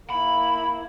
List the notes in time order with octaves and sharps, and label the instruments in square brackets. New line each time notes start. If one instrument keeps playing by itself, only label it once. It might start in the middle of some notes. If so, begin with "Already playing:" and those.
[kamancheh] A#3 E4 [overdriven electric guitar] B5